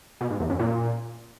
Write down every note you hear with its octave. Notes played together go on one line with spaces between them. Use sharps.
B2
G#2
E2
F#2
A#2